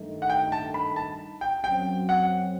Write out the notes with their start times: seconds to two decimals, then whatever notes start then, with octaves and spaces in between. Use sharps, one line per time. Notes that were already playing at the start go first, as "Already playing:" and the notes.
Already playing: G2 D#3 A3 D#4
0.22 F#5
0.30 G5
0.52 A5
0.74 B5
0.96 A5
1.41 G5
1.64 F#2 F#3 C4 G5
2.09 F#5